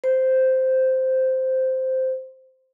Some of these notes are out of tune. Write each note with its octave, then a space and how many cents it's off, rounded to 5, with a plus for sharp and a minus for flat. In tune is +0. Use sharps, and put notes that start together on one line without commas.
C5 -5